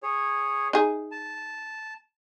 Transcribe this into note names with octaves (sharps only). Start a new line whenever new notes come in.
G#4 C#5
D#4 G#4
A5